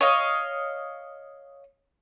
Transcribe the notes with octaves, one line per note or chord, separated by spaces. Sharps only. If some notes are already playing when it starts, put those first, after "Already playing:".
C#5 D#5 F5